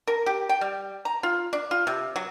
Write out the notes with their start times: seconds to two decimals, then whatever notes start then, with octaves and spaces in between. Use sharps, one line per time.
0.07 A#4
0.26 G4
0.49 G5
0.61 G3
1.05 A#5
1.23 F4
1.53 D4
1.71 F4
1.87 C3
2.16 F#3